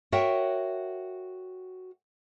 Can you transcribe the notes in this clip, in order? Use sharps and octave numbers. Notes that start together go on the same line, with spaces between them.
F#4 A#4 C#5 E5 F#5 G5